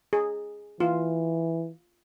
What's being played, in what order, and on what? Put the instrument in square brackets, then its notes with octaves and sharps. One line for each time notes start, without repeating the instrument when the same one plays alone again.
[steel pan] G#4
[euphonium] E3 [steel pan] F4